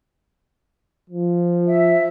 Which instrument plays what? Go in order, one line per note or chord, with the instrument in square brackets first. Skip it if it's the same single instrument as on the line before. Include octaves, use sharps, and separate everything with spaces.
[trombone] F3
[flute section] E5